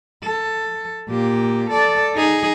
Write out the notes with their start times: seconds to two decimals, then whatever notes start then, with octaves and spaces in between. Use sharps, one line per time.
0.23 A4
1.09 A#2 G4
1.71 A4 D5
2.14 D#4 G#4